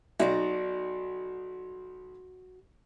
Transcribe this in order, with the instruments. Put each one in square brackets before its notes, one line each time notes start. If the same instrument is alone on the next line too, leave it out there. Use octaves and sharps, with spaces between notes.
[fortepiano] B1 D#4 [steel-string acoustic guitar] F#4 D5 A#5